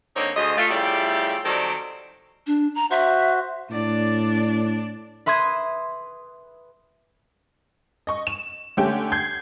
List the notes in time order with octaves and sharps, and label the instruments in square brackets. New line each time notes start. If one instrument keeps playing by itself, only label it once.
[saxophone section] D3 A#3 C4 D#4 C5 C#5
D2 G#3 C5 D#5
A3 F4
C#3 F3 G3 A3 E4 G4
D#3 F#3 G3 C4 A4 D5
[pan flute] D4
A#5
[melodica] F#4 C5 [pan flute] E5
[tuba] A2 [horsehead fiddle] D4 D5
[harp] B4 E5 C6 D#6 G#6
[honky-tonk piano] D#5 C#6
E7
D3 A3 C#4 G4 G5
G6 G#6 C7